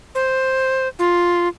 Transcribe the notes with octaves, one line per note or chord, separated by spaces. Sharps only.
C5
F4